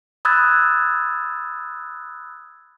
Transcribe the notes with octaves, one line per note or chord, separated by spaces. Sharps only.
B5 D#6 E6 F#6 G#6 A6